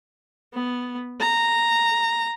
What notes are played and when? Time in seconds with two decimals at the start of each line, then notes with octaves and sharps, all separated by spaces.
0.54 B3
1.20 A#5